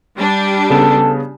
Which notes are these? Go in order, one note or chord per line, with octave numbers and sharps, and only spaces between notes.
G3 D4
C#3 B3 A4 E7